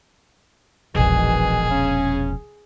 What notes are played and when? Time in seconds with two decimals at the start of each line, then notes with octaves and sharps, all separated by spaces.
0.95 E1 A#1 B2 D#3 E3 G#4
1.70 C#3 C#4